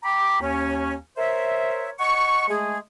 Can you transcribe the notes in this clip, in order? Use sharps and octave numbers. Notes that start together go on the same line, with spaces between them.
G5 A#5 B5 D6
D#2 C#4
A#4 C5 C#5 E5
D#5 F#5 C#6
G#3 A3 G#4